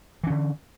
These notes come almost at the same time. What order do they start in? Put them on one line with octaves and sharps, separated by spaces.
E3 C#4 D3